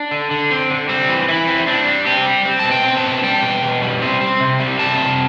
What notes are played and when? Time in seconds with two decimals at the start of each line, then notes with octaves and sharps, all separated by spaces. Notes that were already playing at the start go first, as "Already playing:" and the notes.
Already playing: D4
0.11 D3
0.31 D3
0.51 C4
0.70 D3
0.89 G3 C4
1.09 E3
1.28 E3 E4
1.48 C4
1.67 C4 D4
1.87 G3
2.06 C4 G4
2.26 G3
2.45 C4
2.59 A5
2.64 B2
2.71 G5
2.84 C4
2.97 A5
3.04 B2
3.23 G3 G5
3.43 B2
3.62 B2
3.82 G3
4.02 C4
4.21 C4
4.40 C3
4.60 G3
4.79 C3 A5
4.99 C3